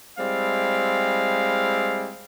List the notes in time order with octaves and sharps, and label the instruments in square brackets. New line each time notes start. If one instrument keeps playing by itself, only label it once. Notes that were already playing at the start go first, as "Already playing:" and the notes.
[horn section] G3 G#3 C4 E4 F5